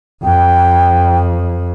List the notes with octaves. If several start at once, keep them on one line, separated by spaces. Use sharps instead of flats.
F2 G5